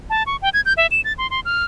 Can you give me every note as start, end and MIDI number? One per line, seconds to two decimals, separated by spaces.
0.10 0.23 81
0.27 0.36 85
0.42 0.49 79
0.54 0.61 92
0.66 0.73 91
0.77 0.87 76
0.91 1.01 100
1.05 1.13 93
1.18 1.30 84
1.30 1.40 84
1.45 1.65 89